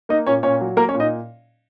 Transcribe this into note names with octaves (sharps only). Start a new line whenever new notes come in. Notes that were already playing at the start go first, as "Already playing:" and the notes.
A#3 D#4 D#5
A#2 C#4 C#5
A#2 C#4 C#5
F#3
A#3 A#4
C#4 C#5
A#2
D#4 D#5